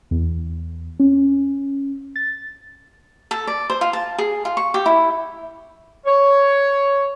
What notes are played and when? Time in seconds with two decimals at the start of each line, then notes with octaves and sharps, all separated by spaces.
0.11 E2
1.00 C#4
2.16 A6
3.31 A4
3.47 D5
3.70 C5
3.81 F4
3.93 A5
4.19 G#4
4.45 F4
4.57 C#6
4.74 G4
4.86 E4
6.05 C#5